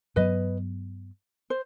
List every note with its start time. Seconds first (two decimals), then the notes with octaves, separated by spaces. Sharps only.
0.16 G2 F#3 B3 B4 D#5
1.50 C5